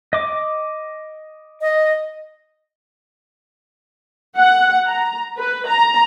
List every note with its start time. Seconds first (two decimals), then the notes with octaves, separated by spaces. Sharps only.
0.13 D#5 D6
1.61 D#5
4.37 F#5
4.86 A#5
5.37 B4
5.67 A#5